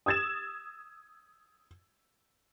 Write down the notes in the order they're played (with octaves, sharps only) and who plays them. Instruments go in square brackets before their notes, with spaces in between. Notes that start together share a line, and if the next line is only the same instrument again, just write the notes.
[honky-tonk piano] D#6 E6 G#6 A6 E7